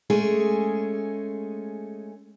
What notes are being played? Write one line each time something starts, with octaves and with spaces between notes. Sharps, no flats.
G#3 A3 C#4 G#4